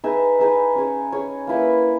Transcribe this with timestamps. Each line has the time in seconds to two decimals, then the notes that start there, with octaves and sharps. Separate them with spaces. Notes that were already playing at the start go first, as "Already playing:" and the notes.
0.04 D#4 G#4 B4 E5
0.39 D#4 G#4 B4 E5
0.75 C#4 G#4 C#5
1.12 C#4 G#4 C#5
1.47 A#3 E4 B4 E5